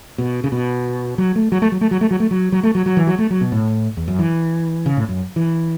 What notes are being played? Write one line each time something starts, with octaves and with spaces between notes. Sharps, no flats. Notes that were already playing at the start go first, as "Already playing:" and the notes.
B2
C#3
B2
F#3
A3
F#3
A3
F#3
A3
F#3
A3
F#3
A3
F#3
F#3
A3
F#3
F#3
E3
F#3
A3
F#3
B2
A2
E2
F#2
E3
C#3
A2
F#2
E3